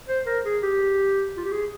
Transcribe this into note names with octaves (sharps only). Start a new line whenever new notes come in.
C5
A#4
G#4
G4
F4
G4
G#4